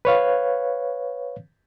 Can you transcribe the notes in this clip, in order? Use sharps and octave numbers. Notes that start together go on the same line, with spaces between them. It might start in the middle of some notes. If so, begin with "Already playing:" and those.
B4 C#5 F5